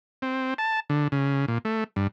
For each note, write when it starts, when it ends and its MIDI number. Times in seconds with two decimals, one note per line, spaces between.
0.22 0.54 60
0.58 0.80 81
0.90 1.08 50
1.12 1.46 49
1.48 1.58 46
1.65 1.84 57
1.96 2.07 43